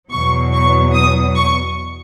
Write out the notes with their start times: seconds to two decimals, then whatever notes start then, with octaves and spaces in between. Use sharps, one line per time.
0.10 E2 B2 F#3 C#6
0.52 C#6
0.94 D#6
1.36 C#6